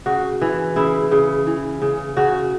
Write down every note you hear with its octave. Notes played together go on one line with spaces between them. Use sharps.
C#3 F#4
E3
C#3 E4
C#3
E3
C#3
C#3 F#4